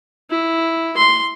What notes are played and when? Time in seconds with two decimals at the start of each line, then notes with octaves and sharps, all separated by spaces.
0.31 E4
0.97 C6